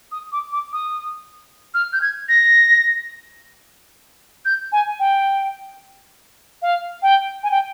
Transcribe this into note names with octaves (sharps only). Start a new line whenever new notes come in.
D#6
D6
D6
D#6
F6
G6
G#6
A#6
G6
G#5
G5
F5
G5
G#5
G5